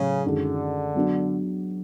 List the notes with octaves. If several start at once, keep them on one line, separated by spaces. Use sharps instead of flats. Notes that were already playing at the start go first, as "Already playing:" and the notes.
Already playing: A2 C#3 F#3 A3
F#2 D3 D#3 G#3
F#3 B3 D4 F#4